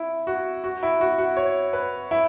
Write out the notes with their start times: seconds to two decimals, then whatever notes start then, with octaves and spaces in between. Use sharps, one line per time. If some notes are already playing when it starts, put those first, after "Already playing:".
Already playing: E4
0.27 F#4
0.64 F#4
0.83 E4
1.01 F#4
1.18 F#4
1.37 C#5
1.73 B4
2.11 E4